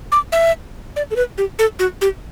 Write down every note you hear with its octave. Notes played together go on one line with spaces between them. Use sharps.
D6
E5
D5
A4
B4
G4
A4
F#4
G4